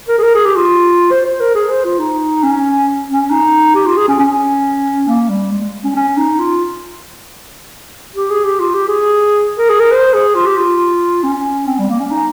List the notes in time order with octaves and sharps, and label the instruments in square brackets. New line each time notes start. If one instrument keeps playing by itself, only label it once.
[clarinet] A#4
G#4
A#4
G#4
G4
F4
C5
C5
A#4
G#4
C5
F4
D#4
C#4
C#4
D#4
G4
F4
G#4
C#4
C#4
A#3
G3
G#3
G#3
C#4
C#4
D#4
F4
G4
G#4
G4
F4
G4
G#4
A#4
G#4
A#4
C5
G#4
F4
G4
F4
C#4
C4
G3
A#3
C#4
D#4